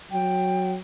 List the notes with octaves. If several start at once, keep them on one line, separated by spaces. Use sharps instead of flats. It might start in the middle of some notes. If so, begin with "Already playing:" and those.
F#3 G5